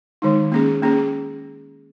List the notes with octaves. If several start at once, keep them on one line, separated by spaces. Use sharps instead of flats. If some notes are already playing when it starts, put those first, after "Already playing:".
D#3 G#3 D#4
A#3 C#4 G#4
A#3 C#4 G#4